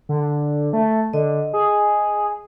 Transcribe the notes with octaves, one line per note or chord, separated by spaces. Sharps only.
D3
A3
D3 D#5
G#4